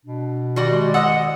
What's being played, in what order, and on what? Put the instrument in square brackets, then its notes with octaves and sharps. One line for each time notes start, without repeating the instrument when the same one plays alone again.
[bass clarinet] B2 [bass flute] D4
[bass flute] D#3 [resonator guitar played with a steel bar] G3 F#4 G4
[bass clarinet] G#3
[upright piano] D#5 D#6 E6 [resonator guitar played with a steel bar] F#5